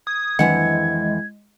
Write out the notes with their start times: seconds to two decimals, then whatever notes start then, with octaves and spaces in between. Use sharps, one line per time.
0.07 D#6 G#6
0.39 F2 D#3 E3 F#3 G#3 D4 F#5